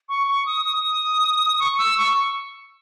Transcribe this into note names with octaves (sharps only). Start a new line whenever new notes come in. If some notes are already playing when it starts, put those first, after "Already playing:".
C#6
C#6
D#6
D#6
C#6
E6
C#6